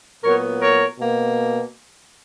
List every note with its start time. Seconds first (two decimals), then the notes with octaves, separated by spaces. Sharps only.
0.23 A#2 F#3 B3 A#4 C#5
0.61 A#4 C#5
0.99 B2 A#3